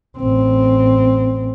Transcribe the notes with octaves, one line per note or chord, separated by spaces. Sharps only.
A1 C4